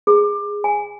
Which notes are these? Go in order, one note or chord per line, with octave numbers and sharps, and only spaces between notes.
G#4
G#5